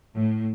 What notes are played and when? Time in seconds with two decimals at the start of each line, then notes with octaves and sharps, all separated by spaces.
0.17 A2